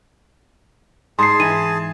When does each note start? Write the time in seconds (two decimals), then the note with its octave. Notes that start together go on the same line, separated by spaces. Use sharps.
1.19 G#2 D#4 G#4 D#5 G#5 A5 C6 C7
1.40 E3 D#7